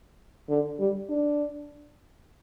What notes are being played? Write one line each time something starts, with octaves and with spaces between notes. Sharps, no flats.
D3
G3
D4